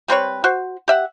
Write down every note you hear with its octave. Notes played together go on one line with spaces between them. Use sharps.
G3 C4 B4 C#5
F#4 C5
G4 E5 F#5